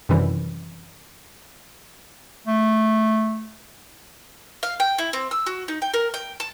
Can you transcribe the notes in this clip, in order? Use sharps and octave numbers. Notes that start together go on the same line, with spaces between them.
F#2 C3 D#3 E3 G3
A3
F5
G5
E4
C4
E6
F#4
D#4
G5
A#4
G5
A5